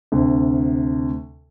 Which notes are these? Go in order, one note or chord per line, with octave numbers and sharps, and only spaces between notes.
D2 C3